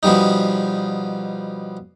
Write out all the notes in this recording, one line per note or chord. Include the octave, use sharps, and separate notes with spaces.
B2 F3 G3 D#4